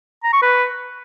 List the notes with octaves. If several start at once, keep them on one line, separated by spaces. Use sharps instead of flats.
A#5
C#6
B4